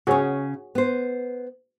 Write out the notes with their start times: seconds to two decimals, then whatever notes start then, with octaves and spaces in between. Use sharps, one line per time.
0.07 C#3 C#4 F#4 G#4 C#5
0.75 B3 C5